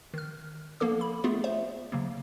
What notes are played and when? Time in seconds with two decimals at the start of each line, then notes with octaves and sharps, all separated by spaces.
0.14 D#3 F6
0.80 F3 A#3 B3 A4 D6
1.01 B5
1.24 A3 B3 F4 G#4
1.44 C5 E5
1.92 C#3 F#3 A#3